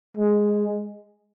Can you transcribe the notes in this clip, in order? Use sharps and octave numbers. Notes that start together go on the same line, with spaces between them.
G#3